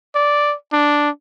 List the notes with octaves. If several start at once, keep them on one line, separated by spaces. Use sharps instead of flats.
D5
D4